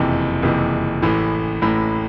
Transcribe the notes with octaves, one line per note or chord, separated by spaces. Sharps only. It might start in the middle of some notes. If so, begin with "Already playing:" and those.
Already playing: F#1 F2 C3 E3
F#1 F2 C3 E3
A1 A2 E3
A1 A2 E3